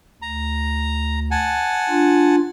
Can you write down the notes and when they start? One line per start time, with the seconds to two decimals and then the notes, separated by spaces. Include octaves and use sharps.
0.22 D2 A#5
1.31 F#5 G#5 A5
1.89 D4 F4